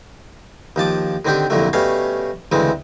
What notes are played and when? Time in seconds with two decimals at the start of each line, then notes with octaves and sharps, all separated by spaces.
0.76 D#2 F3 A5 D6
1.25 D3 D#3 C4 D4 G4
1.50 C2 F2 A#2 D3 F#3 A3
1.73 B2 G3 A3 C#4 C#5 F5
2.52 D2 C#3 E3 G#3 C4